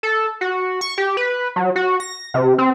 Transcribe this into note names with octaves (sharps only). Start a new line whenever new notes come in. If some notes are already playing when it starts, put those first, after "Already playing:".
A4
F#4
C#6
G4
B4
F#3
F#4
A#6
C3
C4